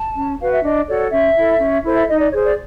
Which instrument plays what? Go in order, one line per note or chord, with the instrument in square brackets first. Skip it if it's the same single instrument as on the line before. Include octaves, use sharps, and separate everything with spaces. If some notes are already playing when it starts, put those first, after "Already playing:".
Already playing: [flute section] A5
C#4
F#4 B4 F5
E5
D4 D#5
F#4 A4 C#5 D5
C#4 E5
E4 A4
C#4
E4 A4 C5
E5
D#4 D#5
D5
G#4 C5 C#5
D5